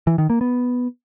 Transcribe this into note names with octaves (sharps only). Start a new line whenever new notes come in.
E3
D#3
A#3
B3